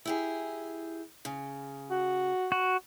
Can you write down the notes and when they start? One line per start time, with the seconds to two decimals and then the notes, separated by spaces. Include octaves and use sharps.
0.05 E4 G4 G#4
1.25 C#3
1.91 F#4
2.52 F#4